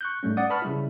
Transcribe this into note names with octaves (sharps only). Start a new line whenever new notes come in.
C#6 F#6 G6
G#2 G3 A3 C#4
D5 F#5 D#6
B4 A5 B5 C#6 F6
C#3 G3 E4